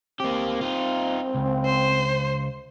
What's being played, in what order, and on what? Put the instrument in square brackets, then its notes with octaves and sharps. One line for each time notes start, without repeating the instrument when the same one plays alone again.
[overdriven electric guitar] A#3 G4 [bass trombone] C4
[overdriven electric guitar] D#4 F4
C#2
[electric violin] C5